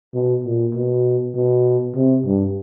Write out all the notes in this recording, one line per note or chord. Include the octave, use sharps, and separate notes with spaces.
B2
A#2
B2
B2
C3
G2